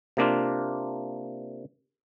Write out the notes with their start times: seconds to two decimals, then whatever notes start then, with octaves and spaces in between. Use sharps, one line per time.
0.17 C3 A#3 D4 F4